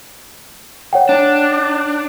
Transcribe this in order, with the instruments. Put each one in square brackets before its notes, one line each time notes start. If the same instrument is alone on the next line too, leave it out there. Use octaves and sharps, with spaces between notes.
[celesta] C#5 F#5 G5
[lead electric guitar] D4